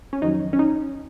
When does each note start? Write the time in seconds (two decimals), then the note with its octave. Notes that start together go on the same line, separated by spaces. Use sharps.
0.13 C#4
0.22 F2 D#3 F#3 D#4
0.53 C#4
0.59 D#4